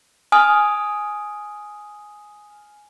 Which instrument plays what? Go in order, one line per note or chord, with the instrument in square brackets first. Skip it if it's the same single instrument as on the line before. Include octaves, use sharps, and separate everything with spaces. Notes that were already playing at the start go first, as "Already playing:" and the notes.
[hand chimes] G#5 D#6 F6